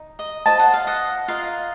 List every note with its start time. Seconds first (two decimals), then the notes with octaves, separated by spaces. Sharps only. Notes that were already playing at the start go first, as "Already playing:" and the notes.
Already playing: D#4
0.19 D#5
0.46 F4 C5 D#5 A5
0.60 F#5
0.73 F5
0.87 D#5 F#5
1.28 F4 A#4 D#5 F5